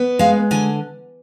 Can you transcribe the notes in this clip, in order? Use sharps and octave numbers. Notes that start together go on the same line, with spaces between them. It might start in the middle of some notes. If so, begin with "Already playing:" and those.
Already playing: B3
G#3 F5
D3 G#5